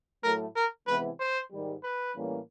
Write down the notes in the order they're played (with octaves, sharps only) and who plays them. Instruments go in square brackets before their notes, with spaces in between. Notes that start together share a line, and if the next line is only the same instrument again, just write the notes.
[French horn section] A2 F#3 A3 [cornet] A#4
[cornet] A#4
[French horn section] C3 E3 G#3 B3 E4 [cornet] B4
[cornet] C5
[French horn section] G#2 D#3 G3
[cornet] B4
[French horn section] A2 E3 G3 A#3 C#4